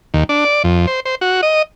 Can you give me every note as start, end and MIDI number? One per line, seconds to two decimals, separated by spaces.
0.14 0.24 39
0.29 0.44 62
0.45 0.63 74
0.64 0.86 41
0.87 1.00 72
1.05 1.15 72
1.21 1.41 66
1.43 1.62 75